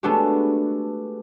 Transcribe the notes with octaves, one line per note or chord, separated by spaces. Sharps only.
G#3 A3 B3 D4 F#4 G4